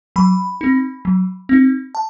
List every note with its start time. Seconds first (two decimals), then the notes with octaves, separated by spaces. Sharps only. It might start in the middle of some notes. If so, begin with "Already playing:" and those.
0.16 F#3 B5
0.61 C4 D#4
1.05 F#3
1.49 C4 D#4
1.95 A5